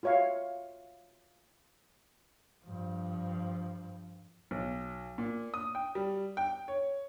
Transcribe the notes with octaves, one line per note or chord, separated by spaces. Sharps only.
F4 F#4 C#5 E5 F5
G2 F3
B1
A#2
D#6
G5
G3
G5
C#5